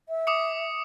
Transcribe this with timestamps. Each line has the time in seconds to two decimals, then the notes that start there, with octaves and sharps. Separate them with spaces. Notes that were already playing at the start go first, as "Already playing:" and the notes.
0.09 E5
0.27 D6 D#6 C#7